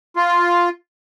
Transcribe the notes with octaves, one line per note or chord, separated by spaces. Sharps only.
F4